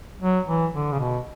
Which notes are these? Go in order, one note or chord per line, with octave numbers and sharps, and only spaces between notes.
F#3
E3
D3
C#3
B2